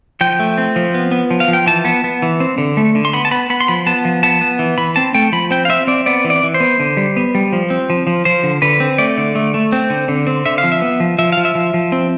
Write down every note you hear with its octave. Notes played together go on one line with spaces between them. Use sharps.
F3 G5
A3
C4
F3
B3
B3
F3
F5
F3
G5
E3 A5
B3
B3
E3
C4
D3
A3
D3
C6
B3 B5
A5
B3 B5
B3 B5
C6
F3 B5
B3 A5
F3
B3 A5
B3
E3
E3 B5
C4 A5
A3 G5
F3 B5
C4 G5
F5
C4 E5
C4 D5
B3 D5
E3
D5
E3
C5
B3
D3
G3
B3
G3
F3
C4
F3
F3
F3 C5
D3
D3 B4
C4
A3 D5
D3
A3
A3
C4
D3
D3
C4
D3 E5
F5
F3
E5
B3
F3
F3 E5
F3 F5
E5
F3
F3
C4